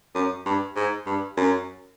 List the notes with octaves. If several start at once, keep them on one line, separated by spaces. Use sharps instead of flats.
F#2
G2
G#2
G2
F#2